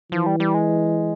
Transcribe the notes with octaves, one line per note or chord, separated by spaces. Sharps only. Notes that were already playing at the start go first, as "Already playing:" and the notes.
E3 F3
G3
G3
G#3